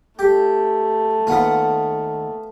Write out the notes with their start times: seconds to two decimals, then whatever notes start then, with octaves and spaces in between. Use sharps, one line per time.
0.19 A3 G4
1.27 D#2 B3 F4 F#5